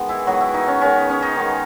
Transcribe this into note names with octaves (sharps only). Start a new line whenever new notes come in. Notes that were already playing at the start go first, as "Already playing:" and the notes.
Already playing: D#3 G#3 B3
E3 E4
D#3 F#3 G#3 B3 F#4
E3 E4
D#4
C#4
D#3 G#3 B3 C#4
C#4
D#4
D#3 G#3 B3